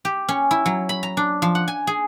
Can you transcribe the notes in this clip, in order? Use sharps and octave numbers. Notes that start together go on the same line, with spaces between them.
G4
C#4
E4
F#3
B5
A#5
D4
F3
F#5
G#5
G#4